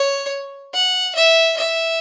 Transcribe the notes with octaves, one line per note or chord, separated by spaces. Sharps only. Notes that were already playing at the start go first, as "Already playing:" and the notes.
Already playing: C#5
F#5
E5
E5